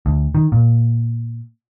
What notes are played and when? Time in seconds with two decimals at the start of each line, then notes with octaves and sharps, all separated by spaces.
0.06 D2
0.35 D#3
0.52 A#2